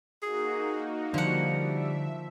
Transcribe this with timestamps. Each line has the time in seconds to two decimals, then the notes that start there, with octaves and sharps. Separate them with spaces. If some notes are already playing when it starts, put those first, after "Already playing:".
0.23 A#3 D#4 F#4 G#4
1.14 D3 F3 G3 F#5
1.63 E5